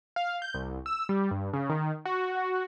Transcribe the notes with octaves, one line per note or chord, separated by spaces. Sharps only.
F5
G6
C2
E6
G3
G2
C#3
D#3
F#4